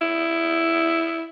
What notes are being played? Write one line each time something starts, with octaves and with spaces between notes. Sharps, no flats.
E4